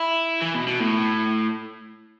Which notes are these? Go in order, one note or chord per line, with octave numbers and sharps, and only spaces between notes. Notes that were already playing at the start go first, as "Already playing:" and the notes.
Already playing: E4
E3
B2
B2
A2